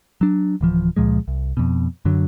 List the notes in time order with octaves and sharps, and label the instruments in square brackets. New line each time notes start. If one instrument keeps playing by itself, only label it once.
[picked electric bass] F#3 D4
D1 E3 F3
C#2 A#2 F3 G#3
C2
F2 B2
F#2 D3 F#3